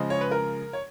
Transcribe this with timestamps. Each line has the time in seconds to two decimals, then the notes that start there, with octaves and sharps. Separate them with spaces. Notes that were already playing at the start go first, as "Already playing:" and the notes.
Already playing: C#3 F3 G#3 D#5
0.10 C#5
0.21 B4
0.31 A#4
0.73 C#5